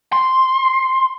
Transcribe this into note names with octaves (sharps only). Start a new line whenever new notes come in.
C6